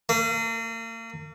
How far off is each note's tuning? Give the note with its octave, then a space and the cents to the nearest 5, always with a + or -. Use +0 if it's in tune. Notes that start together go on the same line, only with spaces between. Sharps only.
A#3 -40